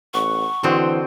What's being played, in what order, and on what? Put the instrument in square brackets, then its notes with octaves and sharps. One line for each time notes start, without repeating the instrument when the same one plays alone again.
[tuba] A1 [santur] F#5 [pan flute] C#6
[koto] D3 C4 [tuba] E3 [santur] F#4 C5 D#5